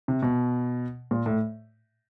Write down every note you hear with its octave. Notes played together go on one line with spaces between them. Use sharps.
C3
B2
A#2
A2